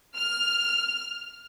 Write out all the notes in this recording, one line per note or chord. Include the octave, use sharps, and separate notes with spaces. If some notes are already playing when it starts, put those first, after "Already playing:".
F6